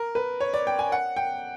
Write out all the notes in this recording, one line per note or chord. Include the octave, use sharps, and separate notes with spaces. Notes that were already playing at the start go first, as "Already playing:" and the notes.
Already playing: A#4
B4
C#5
D5
G5
G#5
F#5
G5